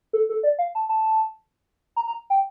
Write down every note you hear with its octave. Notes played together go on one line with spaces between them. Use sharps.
A4
A4
D5
F5
A5
A5
A#5
A#5
G5